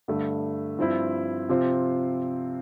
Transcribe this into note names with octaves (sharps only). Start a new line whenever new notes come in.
G2 D3 A3
G2 F3 C4 E4
C3 F3 C4 F4 C5